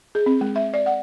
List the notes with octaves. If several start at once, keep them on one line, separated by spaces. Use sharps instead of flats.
G#4
C4
G#3
E5
D5
F#5